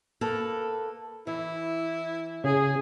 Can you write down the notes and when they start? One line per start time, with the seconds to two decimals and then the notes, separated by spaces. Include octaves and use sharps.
0.21 A#3 A4 B4
1.27 E3 E4
2.44 C#3 G#4